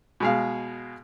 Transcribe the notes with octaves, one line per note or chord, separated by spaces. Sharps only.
B2 G#3 F5